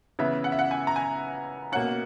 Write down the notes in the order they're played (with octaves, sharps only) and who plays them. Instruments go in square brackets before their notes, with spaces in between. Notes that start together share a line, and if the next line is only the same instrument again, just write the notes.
[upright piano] C#3 E3 B3 E5
F#5
E5
F#5
G#5
A#5
G#5
B2 A#3 C#4 F#5